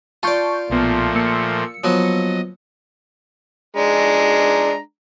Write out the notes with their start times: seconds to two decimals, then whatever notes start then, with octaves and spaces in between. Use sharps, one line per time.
0.23 F4 D5 A5 C#6 G6
0.70 B1 A#2 F3 A3 B3
1.15 A#3 E6 C#7
1.84 F3 F#3 B3 D#5
3.76 G#3 D4 A#5